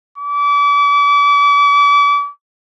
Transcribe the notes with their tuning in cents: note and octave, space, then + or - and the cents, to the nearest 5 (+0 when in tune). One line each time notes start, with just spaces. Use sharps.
D6 -40